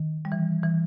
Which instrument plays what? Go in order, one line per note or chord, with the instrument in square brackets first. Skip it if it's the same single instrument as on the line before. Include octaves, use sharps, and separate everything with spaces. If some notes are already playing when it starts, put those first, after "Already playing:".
Already playing: [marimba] D#3
G3
E3
E3